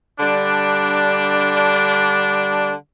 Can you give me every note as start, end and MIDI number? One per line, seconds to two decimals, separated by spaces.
0.20 2.73 50
0.20 2.73 55
0.20 2.73 62